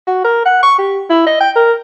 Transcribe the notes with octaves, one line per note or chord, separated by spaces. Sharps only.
F#4
A#4
F#5
C#6
G4
E4
D#5
G5
A#4